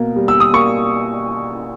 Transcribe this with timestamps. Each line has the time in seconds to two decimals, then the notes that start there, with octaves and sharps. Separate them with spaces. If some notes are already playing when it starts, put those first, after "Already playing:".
Already playing: B2 A#3
0.16 G3
0.28 E6
0.40 D#6
0.53 A#3 C#6